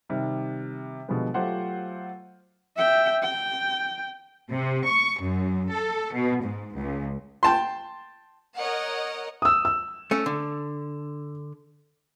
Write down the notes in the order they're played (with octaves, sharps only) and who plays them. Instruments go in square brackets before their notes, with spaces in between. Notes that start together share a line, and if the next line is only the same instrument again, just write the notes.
[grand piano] C3 D#3 G3
B2 D3 F3 G3 G#3 B3
F#3 A3 F4 G4 C5 F#5
[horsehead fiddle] E5 G5
G5
[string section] C3
C#6
F#2
A4
B2
G#2
C#2
[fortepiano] G5 A5 C6
[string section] A#4 C#5 D#5 F#5
[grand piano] D#6 E6
E6
[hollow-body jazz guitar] A3 C#4
D3